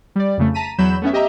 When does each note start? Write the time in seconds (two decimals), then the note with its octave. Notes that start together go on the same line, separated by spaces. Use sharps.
0.16 G3 D5
0.37 F2 C#3 A3
0.54 A5 A#5 B6 D#7
0.78 E2 F#3 B5 G6 E7
1.02 A3 B3 C#4 E5
1.13 G4 D#5 E5 A#5